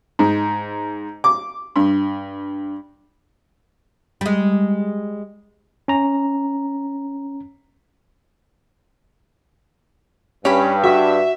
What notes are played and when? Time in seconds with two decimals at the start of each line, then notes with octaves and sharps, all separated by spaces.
0.19 G#2
1.24 D6
1.76 G2
4.21 G3 G#3
5.88 C#4 A#5
10.45 G2 C#4 G4 B5
10.84 F#4 E5